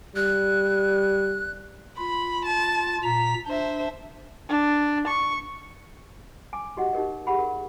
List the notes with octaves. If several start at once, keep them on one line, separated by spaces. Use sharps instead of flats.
G3 F#6
F4 B5
A5
A#2 A#5 B6
D4 C5 E5
D4
C#6
G#5 D6
D#4 F#4 G4 D#5 F#5
D#4 G4 A#4 D#5
G4 G#4 F#5 B5
A#4